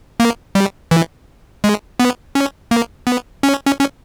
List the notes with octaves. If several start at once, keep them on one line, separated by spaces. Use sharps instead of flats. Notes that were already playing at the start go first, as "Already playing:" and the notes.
A#3
G3
E3
G#3
B3
C#4
A#3
B3
C#4
C#4
C#4